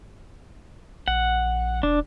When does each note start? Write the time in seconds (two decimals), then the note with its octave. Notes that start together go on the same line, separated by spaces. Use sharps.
1.08 A#1 F#5
1.83 E1 D4